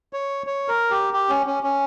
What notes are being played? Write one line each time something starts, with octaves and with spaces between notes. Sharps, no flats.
C#5
C#5
A#4
G4
G4
C#4
C#4
C#4